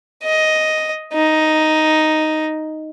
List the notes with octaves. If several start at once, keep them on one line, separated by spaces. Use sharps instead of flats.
D#5
D#4